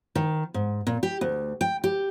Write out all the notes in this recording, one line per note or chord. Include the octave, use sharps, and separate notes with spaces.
D#3
G#2
A#2
G4
D2
G5
G4